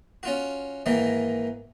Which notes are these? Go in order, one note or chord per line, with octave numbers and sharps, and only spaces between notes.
C#4 F4 F#4
G#2 D#3 E3 A#3